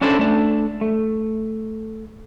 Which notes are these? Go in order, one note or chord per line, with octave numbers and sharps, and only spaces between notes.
C#4 D4 E4 A4 C5
A3 D4
A3